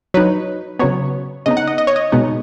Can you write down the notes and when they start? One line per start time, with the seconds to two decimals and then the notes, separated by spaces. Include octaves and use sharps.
0.14 F#3 D#4 B4
0.79 C#3 F#3 B3 C#5
1.46 C#3 B3 D#4 D#5
1.57 F#5
1.68 D#5
1.78 D#5
1.87 C#5
1.96 D#5
2.12 B2 G#3 B3 D#4